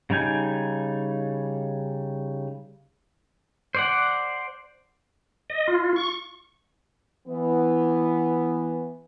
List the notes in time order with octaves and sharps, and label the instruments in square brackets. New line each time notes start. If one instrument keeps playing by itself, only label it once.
[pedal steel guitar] C#3 G3 D#4 G#5 G6
C5 D5 F#5
[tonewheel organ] D#5
F4
C#6
[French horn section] E3 B3